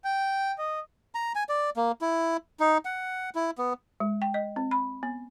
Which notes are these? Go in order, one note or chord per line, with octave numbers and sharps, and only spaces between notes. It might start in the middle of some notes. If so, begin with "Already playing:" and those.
G5
D#5
A#5
G#5
D5
A#3
E4
D#4
F#5
E4
B3
G#3
G5
D#5
C4
B5
B3